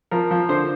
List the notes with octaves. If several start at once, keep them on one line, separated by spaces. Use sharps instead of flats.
F3 A#4
F3
D3 C5